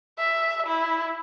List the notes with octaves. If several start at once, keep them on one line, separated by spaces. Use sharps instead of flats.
E5
E4